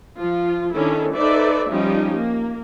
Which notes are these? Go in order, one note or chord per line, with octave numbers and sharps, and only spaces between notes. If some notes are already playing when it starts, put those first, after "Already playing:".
F3 F4
D#3 C#4 D4 E4 A4
D#4 A4 B4 C5 D5 E5
F3 G3 C#4 D#4 G4
A#3